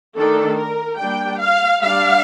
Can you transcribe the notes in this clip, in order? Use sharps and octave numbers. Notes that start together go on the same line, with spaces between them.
D#3 A3 D4 A4
A#4
G3 A#3 D4 G5
F5
G3 D4 F5